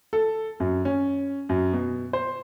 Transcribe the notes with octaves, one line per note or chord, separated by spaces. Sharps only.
A4
F#2
C#4
F#2
B2
C5